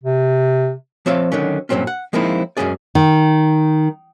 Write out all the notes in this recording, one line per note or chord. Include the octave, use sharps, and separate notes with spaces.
C3
F3 C4 C#5 E5 F5
D3 D#3 F#3 C#4
G2 A#2 F3 F#3 C4 C#4
F#5
F3 G#3 A#3 C4 D#4 E4
F#2 A#2 G#3 C#4 G#4 D5
D#3